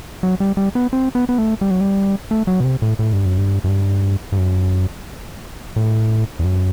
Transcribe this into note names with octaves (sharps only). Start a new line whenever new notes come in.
F#3
G3
G3
B3
C4
B3
B3
A3
G3
F#3
G3
A3
F#3
B2
C3
A2
A2
G2
F#2
G2
F#2
G2
G2
F#2
A2
E2
F#2